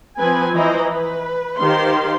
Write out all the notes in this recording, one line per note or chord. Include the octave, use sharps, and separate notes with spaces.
F3 C4 B4 G#5
E3 E4 C5 D#5 A#5
B4
D#3 G4 C5 F5 C6